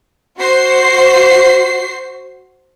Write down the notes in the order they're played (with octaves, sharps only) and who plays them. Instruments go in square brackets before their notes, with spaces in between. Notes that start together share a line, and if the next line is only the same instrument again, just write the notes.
[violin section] F#4 C5 C7